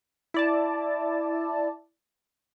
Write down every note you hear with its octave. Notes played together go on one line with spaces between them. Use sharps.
E4 D5 A5